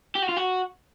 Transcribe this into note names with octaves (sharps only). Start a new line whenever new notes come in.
G4
F#4
F4
F#4